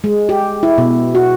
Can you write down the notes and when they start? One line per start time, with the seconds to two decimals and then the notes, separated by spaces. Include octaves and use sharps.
0.04 G#3
0.29 G4
0.63 E4
0.78 B2
1.15 F#4